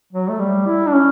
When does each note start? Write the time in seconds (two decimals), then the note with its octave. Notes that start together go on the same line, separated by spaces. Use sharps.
0.13 F#3
0.29 A3
0.39 G3
0.67 E4
0.87 D4
0.93 C#4